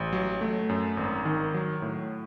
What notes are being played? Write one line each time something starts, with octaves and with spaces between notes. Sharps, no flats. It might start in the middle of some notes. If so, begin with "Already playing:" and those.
Already playing: A1
F#3
A3
F#2
G#1
D#3
F#3
A2